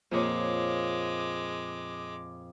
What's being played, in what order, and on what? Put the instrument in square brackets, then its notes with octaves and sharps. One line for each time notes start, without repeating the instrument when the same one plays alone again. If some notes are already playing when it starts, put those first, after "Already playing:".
[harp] F2 A#2 C#5 [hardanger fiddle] G#3 D6